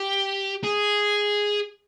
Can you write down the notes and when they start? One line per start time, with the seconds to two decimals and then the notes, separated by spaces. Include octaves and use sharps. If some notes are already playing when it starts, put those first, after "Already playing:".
Already playing: G4
0.64 G#4